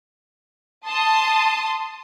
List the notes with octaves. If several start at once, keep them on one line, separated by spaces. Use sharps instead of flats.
A5 C6 D#6